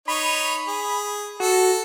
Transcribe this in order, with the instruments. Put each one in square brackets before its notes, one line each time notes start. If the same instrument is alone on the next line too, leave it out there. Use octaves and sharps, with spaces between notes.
[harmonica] D#4 C#5 [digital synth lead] B5
[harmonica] G#4
[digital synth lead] F#4 [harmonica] A4